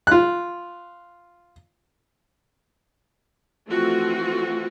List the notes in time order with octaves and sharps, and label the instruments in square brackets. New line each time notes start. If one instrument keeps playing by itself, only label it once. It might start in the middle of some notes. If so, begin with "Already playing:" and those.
[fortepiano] F4 F#6
[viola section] E3 F3 A3 C4 F4 F#4